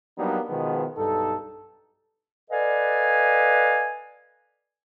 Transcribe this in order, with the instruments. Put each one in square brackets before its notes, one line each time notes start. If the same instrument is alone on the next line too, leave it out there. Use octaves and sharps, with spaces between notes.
[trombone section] F#3 G3 A#3 B3 D4 D#4
B2 D#3 F3 G#3 B3
B1 G2 D#4 A4
[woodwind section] A4 B4 D5 D#5 F5 G#5